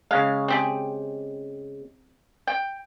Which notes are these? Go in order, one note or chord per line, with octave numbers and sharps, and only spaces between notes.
C#3 G#3 F5
C4 G4 G#4
G5